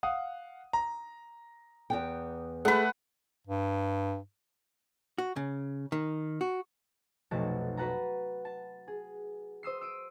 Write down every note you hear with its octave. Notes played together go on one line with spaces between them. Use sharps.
F5 F#5 D#6
A#5
E2 B3 G5
A3 G#4 A4 B4 F#5
G2
F#4
C#3
D#3
F#4
F1 B1 B2 A3 F#4 A5
F#4 B4 F#5 A5 A#5
A5
G#4
C5 D#6 E6 C7
E6 D7 D#7